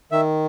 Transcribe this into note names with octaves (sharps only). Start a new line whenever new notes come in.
D#3 E5